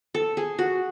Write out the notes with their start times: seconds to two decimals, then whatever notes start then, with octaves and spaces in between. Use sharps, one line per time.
0.14 A4
0.37 G#4
0.59 F#4